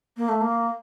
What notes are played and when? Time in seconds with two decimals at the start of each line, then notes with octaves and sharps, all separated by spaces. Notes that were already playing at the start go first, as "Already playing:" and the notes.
0.17 A#3
0.29 A3
0.41 A#3